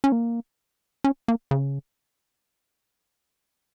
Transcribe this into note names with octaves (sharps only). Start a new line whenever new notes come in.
C#4
A#3
C#4
A#3
C#3